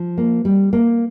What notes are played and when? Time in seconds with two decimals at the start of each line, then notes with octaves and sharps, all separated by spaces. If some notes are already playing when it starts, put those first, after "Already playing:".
Already playing: F3
0.18 A#3
0.45 G3
0.73 A#3